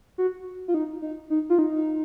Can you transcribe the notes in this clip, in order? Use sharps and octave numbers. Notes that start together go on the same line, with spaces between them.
F#4
F4
D#4
D#4
D#4
F4
D#4